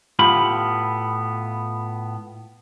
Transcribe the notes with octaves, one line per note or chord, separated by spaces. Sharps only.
A2 B3 F4 G4 B5